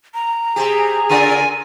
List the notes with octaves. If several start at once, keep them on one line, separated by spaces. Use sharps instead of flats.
A#5
C3 G4 G#4
C#3 F4 A#4 G#5